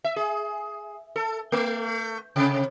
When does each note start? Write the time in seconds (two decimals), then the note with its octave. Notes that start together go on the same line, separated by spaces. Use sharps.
0.04 E5
0.16 G#4
1.16 A4
1.52 A3
2.36 C3